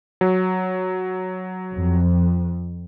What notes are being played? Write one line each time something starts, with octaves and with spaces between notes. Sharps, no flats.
F#3
F2